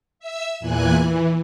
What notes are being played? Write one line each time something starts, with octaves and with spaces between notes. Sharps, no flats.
E5 E6
E2 A#2 E3 G#5 F#6
E3